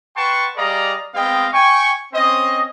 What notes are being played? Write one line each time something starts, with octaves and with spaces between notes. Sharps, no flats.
B4 F#5 G5 A5 C6 C#6
G3 G#4 D5 D#5 F5 A#5
G#3 B3 C4 D#5 F5 G5
G5 G#5 C#6
C4 C#4 C5 D#5